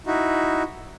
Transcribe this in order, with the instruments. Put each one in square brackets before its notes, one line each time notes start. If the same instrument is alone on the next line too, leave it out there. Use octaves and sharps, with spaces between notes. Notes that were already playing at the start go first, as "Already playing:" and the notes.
[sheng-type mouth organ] D#4 E4 F#4